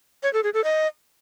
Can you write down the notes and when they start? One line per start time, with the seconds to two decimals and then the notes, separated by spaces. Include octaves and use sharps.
0.23 C#5
0.33 A4
0.44 G#4
0.54 A4
0.64 D#5